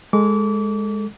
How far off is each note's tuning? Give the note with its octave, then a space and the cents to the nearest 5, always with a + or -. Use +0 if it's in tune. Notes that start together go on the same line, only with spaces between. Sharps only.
G#3 +0 A4 +10 D6 -30